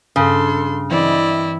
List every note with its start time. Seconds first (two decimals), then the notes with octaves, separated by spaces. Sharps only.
0.16 G2 C#3 A4 C6
0.90 E3 C4 E4 D5 D#5